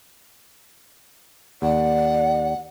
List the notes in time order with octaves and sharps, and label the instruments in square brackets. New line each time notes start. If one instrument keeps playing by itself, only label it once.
[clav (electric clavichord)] D#2 [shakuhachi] D5 [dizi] F#5